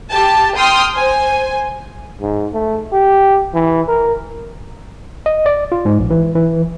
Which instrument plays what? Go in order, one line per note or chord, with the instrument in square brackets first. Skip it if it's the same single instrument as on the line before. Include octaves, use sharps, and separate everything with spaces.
[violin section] G4 A5
G5 C6 D#6 F6
C5 G#5
[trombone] G#2
A3
G4
E3
A#4
[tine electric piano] D#5
D5
F4
G#2
A#1
E3
E3